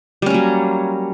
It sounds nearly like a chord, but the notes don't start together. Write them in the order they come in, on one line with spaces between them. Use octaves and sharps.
G3 C#4 A#3 F#3